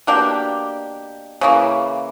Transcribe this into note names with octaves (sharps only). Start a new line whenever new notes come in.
B2 A#3 D4 G4
C#3 E3 A#3